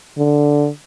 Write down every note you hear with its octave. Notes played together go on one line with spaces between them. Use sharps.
D3